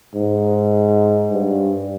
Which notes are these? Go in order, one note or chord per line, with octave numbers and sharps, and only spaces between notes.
G#2
G2